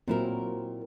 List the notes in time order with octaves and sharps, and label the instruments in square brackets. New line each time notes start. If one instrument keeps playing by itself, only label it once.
[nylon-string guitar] A#2 E4 A#4 [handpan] F#3 C4